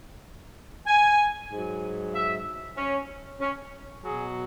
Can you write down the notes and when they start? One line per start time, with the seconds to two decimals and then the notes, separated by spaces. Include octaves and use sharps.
0.86 G#5
1.50 G#2 F#3
2.14 E5
2.77 C#4
3.40 C#4
4.03 B2 F#3 G#4